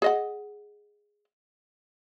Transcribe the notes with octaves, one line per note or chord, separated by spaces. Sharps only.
G#4 D#5 F#5